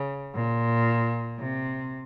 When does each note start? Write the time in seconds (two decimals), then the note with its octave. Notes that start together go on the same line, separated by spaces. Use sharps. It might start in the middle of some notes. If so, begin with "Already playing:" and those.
Already playing: C#3
0.34 A#2
1.39 C3